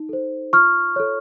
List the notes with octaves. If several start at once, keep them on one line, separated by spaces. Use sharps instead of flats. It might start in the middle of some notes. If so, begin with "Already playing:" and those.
Already playing: D#4
A4 C5
F4 C#6 F6
A4 C#5